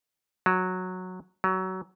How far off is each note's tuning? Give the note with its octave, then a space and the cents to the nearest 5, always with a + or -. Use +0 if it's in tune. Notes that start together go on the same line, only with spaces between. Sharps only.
F#3 -10
F#3 +20